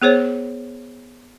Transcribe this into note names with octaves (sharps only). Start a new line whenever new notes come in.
B3 G#4 C5 C#5